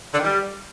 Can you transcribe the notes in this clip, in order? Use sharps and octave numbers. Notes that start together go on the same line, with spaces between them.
D3
D#3
G3